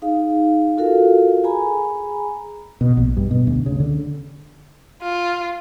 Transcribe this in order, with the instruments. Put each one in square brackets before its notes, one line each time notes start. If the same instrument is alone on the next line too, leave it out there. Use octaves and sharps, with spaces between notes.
[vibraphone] D#4 G#4 F5
F4 F#4 A4 A#4 F5
G#4 G#5 A#5 B5
[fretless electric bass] B2
A#1
G2
B2
D2
C#3
D3
[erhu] F4